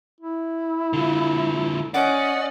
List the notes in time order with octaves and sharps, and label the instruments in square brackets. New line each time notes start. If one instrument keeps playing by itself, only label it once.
[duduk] E4
[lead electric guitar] D3 F4
[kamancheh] C#4 D#5 [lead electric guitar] D5 [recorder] F#5